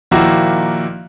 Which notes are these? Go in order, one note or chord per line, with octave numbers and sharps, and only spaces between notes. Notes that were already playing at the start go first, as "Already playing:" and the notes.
A#2 D#3 F3 A#3 E4 F#4